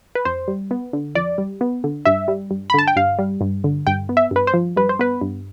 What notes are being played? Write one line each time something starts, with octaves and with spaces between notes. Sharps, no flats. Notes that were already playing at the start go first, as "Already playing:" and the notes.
B4
F2 C5
G3
B3
D3
F2 D5
G3
B3
D3
G2 E5
G3
G2
B5
D3 A5
G5
G2 F5
G3
G2
D3
G2 G5
B3
E5
G2 B4
C5
F3
G2 B4
C5
B3 B4
G2